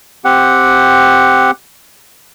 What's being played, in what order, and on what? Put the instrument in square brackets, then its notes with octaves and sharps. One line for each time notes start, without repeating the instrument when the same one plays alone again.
[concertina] C4 G4 F#5